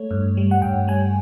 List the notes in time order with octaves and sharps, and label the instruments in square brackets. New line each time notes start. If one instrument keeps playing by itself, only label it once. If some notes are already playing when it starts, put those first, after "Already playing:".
Already playing: [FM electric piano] A3 C#5
G2
G3
F#5
G2 G5
G3 G#5